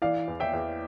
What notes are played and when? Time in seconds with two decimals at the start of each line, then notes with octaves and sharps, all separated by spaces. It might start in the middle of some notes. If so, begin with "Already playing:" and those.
0.02 E3 D5 F5
0.28 E2
0.40 E5 G5
0.53 E2